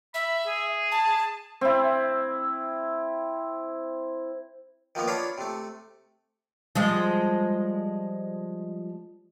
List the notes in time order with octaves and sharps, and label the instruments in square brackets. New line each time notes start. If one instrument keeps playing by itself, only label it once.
[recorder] E5 [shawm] B5
[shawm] G#4
[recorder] A5
[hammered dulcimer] C4 E4
[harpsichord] D#3 F3 A#3 B3
D4 F4 C#5 F5 A#5 B5
C3 A3
[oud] F3 G3 G#3